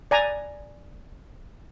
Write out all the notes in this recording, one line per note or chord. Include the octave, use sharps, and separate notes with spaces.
D5 G#5 A#5